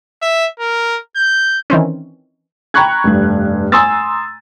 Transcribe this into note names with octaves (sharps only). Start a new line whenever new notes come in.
E5
A#4
G6
D#3 E3 C4 C#4
G5 A#5 B5 C#6 F#6 G#6
F1 G2
G#5 A#5 C6 D#6 E6 A6